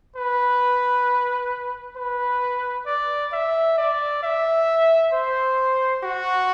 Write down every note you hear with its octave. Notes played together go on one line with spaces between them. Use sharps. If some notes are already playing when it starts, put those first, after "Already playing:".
B4
B4
D5
E5
D5
E5
C5
F#4